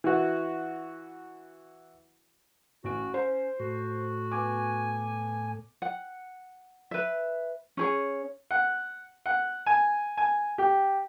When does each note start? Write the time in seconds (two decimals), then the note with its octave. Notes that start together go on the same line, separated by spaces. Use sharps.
0.04 E3 F#4
2.84 A1 C#4 F#4 D7
3.14 C#4 C5
3.60 A2 F#4
4.32 B3 G#5 D6
5.82 F#5
6.91 B4 E5
7.77 C#4 G#4 C#5
8.51 F#5
9.26 F#5
9.66 G#5
10.17 G#5
10.58 G4